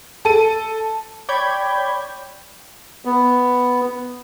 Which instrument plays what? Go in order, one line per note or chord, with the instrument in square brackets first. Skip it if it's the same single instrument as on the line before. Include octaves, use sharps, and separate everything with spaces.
[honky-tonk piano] A4 D#7
[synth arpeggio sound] C#5 D5 G5 B5 G6 G#6
[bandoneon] B3